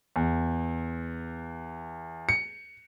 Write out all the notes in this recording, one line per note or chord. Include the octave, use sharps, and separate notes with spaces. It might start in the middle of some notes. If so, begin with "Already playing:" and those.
E2
C#7